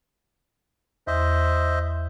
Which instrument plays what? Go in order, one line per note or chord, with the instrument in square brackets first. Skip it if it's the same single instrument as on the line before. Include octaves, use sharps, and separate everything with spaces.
[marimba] E2 [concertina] C5 D#5 E5